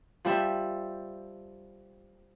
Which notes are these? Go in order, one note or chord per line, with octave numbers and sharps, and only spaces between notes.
F3 G3 E5